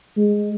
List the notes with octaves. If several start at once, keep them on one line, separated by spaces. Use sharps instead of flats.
G#3